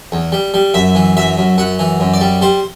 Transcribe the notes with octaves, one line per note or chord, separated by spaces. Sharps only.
E2
G3
G3
F#2 E5
E3
F#2 E5
F#2
F#2 F#5
E3
F#2
D5
G3
G3 C5